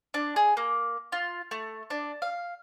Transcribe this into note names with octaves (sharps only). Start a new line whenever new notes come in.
D4
G#4
A#3
F4
A3
D4
F5